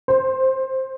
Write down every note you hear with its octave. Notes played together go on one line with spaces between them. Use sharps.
C5